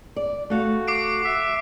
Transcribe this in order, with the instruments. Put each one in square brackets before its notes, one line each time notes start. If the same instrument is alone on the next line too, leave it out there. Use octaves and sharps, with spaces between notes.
[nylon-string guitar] D5
[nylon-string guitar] A3 F5 [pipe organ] F#4
[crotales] D6 C7 D7
[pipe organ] E5